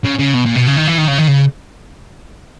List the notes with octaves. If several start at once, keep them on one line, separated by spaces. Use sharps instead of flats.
C#3
C#3
B2
A#2
B2
C#3
D#3
E3
D#3
C#3
D#3
C#3